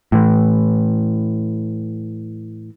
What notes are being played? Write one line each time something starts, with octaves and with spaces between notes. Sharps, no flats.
A2 E3